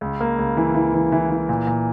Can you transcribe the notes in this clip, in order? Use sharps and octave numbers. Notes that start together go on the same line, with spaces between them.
C#2
A#3
C#2
E3
E3
E3
E3
E3
A#2
A#2